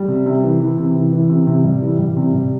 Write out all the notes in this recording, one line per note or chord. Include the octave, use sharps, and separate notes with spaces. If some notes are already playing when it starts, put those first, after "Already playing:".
Already playing: G3
C3
C3
E3
E3
C3
E3
E3
C3
C3
G3
E3
G3
C3
G3